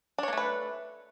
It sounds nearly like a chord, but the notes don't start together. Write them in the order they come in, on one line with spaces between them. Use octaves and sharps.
D4 C#5 A#3 A3 B4